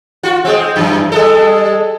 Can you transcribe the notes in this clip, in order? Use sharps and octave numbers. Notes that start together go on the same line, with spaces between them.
F4 F#4
G#3 C4
F#2 E3
G3 G#3 A4